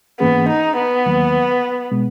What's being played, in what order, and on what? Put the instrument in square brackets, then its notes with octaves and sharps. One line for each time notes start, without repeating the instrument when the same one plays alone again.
[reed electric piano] G#2 E3 A#3 C#4 G#4 [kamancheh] B3
[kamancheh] D#4
B3
[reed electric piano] D#2 D#3 F#3 A#3
B2 G#3 B3